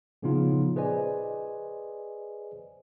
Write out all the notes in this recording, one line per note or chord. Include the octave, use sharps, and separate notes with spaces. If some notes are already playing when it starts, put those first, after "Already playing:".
A#2 C#3 F3 B3 D#4 F4
G#4 B4 C5 D5 D#5 G#5